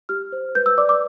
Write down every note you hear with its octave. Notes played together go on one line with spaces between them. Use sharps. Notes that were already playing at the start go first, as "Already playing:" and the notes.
G4 F6
C5
B4 G6
E6
D5 D6
D6